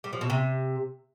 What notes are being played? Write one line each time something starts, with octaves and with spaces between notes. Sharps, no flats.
G3
F3
B2
C3